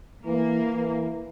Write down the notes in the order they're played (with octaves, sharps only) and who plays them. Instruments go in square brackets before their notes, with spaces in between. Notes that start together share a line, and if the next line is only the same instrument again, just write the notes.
[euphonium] E3 [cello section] A#3
[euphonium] E3